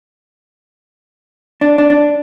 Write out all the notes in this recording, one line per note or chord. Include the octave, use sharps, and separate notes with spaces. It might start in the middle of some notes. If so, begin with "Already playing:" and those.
D4
D4
D4